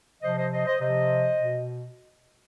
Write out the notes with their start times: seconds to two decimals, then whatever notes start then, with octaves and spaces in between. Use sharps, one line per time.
0.22 C3 F3 C5 D#5
0.37 C5 D#5
0.51 C5 D#5
0.66 C5 D#5
0.80 C3 F3 C5 D#5
1.40 B2